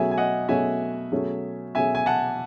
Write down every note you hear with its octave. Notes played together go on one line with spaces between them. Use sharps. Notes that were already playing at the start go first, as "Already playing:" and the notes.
Already playing: B2 F#3 A3 C#4 G#4 E5 G#5
G#5
D#5 F#5
B2 F#3 A3 C#4 G#4 E5 G#5
B2 F#3 A3 C#4 G#4
B2 F#3 A3 C#4 G#4 E5 G#5
G#5
F#5 A5